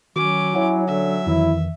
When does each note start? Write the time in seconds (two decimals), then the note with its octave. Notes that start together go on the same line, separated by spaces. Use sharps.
0.16 D#3 F#3 C#4 F#4 D6
0.55 E4 C#5 F#5 G#5
0.88 D3 E5
1.26 F2 D#3 E3 E4